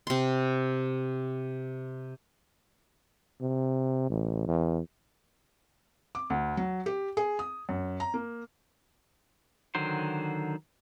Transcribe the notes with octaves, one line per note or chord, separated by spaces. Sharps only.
C3 C6
C3
A1
E2
D6
D2
F#3
G4
G#4
D#6
F#2
A#5
A#3
D3 D#3 F#3 C5